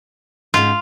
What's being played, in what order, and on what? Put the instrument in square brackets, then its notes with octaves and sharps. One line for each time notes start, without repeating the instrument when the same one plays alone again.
[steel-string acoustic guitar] G#2 C#3 [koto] F4